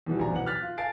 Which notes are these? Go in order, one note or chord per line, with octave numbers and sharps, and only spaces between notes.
E2 B2 E3 G3
A#1 F2 D5 G#5 A#5
B1 E2 B3 F#5 F#7
F6 F#6 A6 B6
F4
F5 G#5 A5 A6 C7 D7